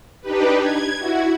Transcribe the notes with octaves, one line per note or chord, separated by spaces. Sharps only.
D4 D#4 G4 B4
G#6
E4 F#4